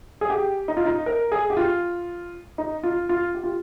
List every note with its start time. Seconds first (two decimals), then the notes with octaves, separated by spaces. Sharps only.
0.21 G#4
0.30 G4
0.68 D#4
0.77 F4
0.86 D#4
1.06 A#4
1.32 G#4
1.50 G4
1.57 F4
2.58 D#4
2.83 F4
3.09 F4
3.35 G4
3.43 F4